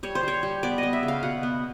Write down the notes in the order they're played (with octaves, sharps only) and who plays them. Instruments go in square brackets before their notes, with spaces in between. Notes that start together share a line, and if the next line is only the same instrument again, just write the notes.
[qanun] G3 C#5
C5
G3 C#5
G3
B3 D5
D#5
B3
E5
C#3
F5
B2 F#5
B3